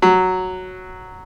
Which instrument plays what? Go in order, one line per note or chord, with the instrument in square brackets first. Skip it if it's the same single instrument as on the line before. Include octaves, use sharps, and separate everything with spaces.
[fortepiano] F#3